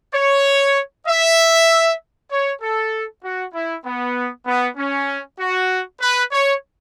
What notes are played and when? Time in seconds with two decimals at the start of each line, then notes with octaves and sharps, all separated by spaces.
0.15 C#5
1.07 E5
2.31 C#5
2.61 A4
3.23 F#4
3.54 E4
3.84 B3
4.46 B3
4.77 C#4
5.39 F#4
6.01 B4
6.32 C#5